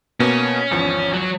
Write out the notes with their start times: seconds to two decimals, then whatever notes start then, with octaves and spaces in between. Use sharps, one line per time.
0.20 B2 A#3 B3 C#4
0.71 G#1 E2 F3
1.13 F#3 F#4